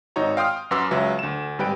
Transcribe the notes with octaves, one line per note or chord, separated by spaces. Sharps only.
G#1 D#4 F#4 C#5 A#5
F5 G5 C6 D#6 F6
F#2 F#4 B4 C6 D6 E6
C#2 F#3 B4 E5
D2 E7
G#1 G3 B4 G5 D7